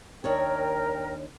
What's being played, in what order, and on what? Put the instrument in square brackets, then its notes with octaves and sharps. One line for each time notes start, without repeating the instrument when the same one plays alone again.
[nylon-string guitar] D#2 D4 C#5 [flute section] A#4 G5